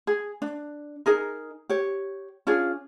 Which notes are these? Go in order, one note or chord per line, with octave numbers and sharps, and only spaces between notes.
G#4
D4
D#4 G#4 A#4
G4 C#5
C#4 D4 F4 G#4